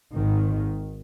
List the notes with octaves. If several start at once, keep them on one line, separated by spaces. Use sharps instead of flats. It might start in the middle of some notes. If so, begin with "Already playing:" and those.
G#1 G#2 D#3